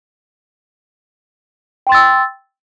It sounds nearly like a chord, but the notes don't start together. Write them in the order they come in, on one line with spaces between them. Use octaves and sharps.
G5 C6 A6 E6